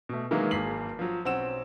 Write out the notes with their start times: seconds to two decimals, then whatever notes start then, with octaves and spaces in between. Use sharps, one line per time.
0.09 B2 A3
0.31 D#3 E3 F#3 G#3 A#3
0.51 G#1 A#3 G#4 B6 C7 F#7
0.99 F3 F#3
1.25 B1 C4 C#4 F#5 E6 E7